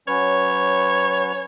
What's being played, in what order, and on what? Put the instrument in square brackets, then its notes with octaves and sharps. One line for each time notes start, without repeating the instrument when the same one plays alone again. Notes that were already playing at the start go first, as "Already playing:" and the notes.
[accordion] F#3 C#4 B4 [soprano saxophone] C#5